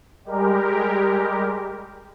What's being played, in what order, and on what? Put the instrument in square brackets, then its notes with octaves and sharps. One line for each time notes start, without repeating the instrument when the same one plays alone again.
[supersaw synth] G3 G#3 G4 A#4